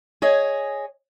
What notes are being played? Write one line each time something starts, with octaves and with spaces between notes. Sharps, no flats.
G#4 C#5 D#5